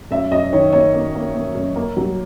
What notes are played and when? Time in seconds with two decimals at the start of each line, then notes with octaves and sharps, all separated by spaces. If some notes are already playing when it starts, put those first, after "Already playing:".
0.11 F#2 E5
0.31 F#2 D#5
0.53 D#3 C#5
0.73 A#3 C#5
0.94 A#3
1.15 A#3
1.35 A#3
1.55 F#2
1.76 A#3
1.97 F#3